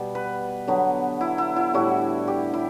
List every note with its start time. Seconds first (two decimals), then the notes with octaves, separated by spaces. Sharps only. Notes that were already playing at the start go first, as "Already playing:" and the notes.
Already playing: B2 G3 B3
0.15 B4
0.68 D3 F#3 B3
1.21 E4
1.38 E4
1.56 E4
1.74 A2 G3 D4 F#4
2.28 G4
2.54 E4